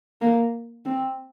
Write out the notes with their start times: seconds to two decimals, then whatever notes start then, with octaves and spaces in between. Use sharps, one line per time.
0.22 A#3
0.86 C4